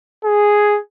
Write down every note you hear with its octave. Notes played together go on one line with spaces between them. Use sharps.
G#4